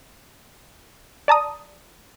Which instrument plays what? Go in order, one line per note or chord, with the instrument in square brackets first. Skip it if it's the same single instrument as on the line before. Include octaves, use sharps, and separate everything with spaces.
[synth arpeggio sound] D5 A5 A#5 D#6